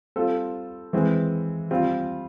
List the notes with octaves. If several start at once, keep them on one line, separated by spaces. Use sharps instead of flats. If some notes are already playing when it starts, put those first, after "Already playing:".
G3 C4 F4 A4 C5
E3 G#3 C4
G3 C4 F4